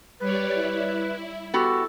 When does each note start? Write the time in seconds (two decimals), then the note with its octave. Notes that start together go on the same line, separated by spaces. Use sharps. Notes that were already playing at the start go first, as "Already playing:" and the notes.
0.20 G3 B4 C#5 D5
0.54 E4
1.54 B3 F#4 G4 A4